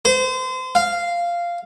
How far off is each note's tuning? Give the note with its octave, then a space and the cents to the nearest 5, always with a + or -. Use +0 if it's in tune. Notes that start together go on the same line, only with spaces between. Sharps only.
C5 -30
F5 -10